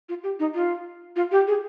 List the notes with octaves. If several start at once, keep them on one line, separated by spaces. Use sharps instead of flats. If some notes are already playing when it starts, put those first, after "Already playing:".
F4
G4
D#4
F4
F4
G4
G#4